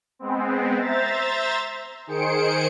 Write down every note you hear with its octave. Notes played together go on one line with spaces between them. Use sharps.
G#3 B3 C4
C5 E5 A#5 A6
D#3 G#4 C5 C#7 D7